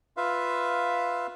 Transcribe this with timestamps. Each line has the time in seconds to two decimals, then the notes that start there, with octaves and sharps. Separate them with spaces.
0.17 F4 B4 E5 F5